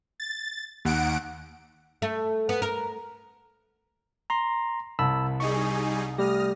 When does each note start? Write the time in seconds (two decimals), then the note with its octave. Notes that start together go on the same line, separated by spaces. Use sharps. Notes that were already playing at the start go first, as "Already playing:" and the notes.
0.20 A6
0.85 D#2 F#5 D7
2.02 A3
2.49 B3
2.62 A#4
4.30 A#5 C6
4.99 C2 A5 B5 E6
5.40 G3 D#4 G#4 C#6
6.18 G3 A3 G4 D#6 F6 A#6